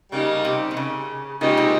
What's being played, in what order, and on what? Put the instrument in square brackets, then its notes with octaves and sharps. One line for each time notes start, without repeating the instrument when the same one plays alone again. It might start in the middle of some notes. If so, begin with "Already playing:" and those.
[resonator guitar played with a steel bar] C#3 [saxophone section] G3 A#3 D#4 G4
[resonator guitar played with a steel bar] C3
D#3
C#3
[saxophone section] A#2 G#3 D#4 G4 [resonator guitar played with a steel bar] C#3
[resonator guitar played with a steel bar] C3